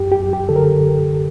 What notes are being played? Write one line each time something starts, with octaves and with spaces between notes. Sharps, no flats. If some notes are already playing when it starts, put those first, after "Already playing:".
Already playing: F#2 G4
G4
F#2
G4
D3 A4
A#4